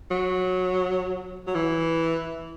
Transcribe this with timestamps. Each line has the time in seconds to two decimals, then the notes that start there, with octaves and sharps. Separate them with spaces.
0.11 F#3
1.47 F#3
1.55 E3